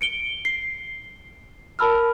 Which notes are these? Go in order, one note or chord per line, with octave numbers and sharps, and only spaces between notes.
C#7 D7 G7
C7
A#4 A5 B5 E6 F6